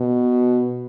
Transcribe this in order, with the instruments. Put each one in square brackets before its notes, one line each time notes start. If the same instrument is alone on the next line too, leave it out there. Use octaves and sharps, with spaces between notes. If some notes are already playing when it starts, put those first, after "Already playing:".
Already playing: [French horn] B2